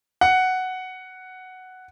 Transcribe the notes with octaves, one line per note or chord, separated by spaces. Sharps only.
F#5